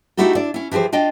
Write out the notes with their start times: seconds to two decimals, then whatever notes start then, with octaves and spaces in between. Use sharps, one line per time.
0.17 A3 D#4 E4 F#4 G4 A4
0.35 D4 E4 D5
0.54 C#4 E4
0.71 E3 F3 G4 G#4 C5
0.92 D4 F4 D#5 G5